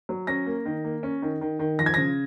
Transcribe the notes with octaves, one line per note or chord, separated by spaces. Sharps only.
F#3
C#4 A#6
A#3
D#3
A#3
C#4
D#3
D#3
D#3
F3 A#6
G#6
C#3 A#6